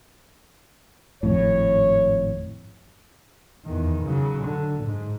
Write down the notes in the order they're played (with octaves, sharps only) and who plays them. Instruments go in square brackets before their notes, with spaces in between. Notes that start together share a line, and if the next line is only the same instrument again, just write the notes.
[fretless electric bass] G#1 F2 A2 [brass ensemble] C#5
[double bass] E2 D#3
C#3 F#3
D3
G#2